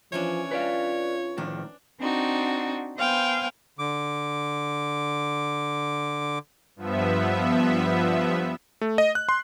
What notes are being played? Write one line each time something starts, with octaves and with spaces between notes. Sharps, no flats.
E3 F3 C#4 D4 C#5
F4 B4 D5 F5
A2 D#3 F3 D4
C4 D4 D#4 F#4
B3 C5 F5 G5 G#5
D3 D6
G2 F3 B3 E5
A3
D#5
F#6
C6